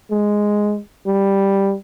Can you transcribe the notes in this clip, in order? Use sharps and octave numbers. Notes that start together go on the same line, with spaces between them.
G#3
G3